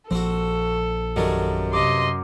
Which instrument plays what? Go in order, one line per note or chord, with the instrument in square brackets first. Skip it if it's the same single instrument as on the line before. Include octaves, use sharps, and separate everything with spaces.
[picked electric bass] A#1 F3 [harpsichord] C4 F#4 [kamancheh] A4
[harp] F#2 [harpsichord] D#3 G3 A3
[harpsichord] G2 C3 [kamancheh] D#5 C6 [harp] D6